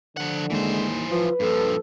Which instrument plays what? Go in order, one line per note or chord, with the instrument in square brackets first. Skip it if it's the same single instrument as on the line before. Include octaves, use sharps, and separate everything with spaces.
[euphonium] D3 [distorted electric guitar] F3 F#5
[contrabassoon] D#2 [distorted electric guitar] E3 C5 [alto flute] G#3
[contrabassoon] F3 [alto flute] F4 [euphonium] B4
[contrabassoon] A#1 [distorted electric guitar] G2 F3 [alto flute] A4